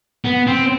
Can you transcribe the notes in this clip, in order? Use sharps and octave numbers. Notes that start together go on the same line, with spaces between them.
B3
C4